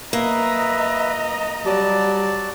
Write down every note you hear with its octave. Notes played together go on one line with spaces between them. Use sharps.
A#3 B4 D#5 E5 A#5
F#3 G3 D5 A5